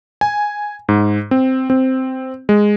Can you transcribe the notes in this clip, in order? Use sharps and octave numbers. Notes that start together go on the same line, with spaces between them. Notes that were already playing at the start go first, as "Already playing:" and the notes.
G#5
G#2
C4
C4
G#3